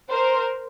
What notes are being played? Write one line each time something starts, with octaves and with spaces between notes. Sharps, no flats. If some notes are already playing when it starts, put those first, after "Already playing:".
A#4 C5